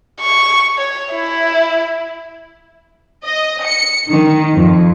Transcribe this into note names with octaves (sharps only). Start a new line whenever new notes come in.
C#6
C#5
E4
D#5
C#7
D#3
F2